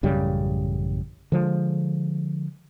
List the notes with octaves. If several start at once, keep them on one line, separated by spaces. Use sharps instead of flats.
A1 F#2 C#3 G3
D3 F3 G#3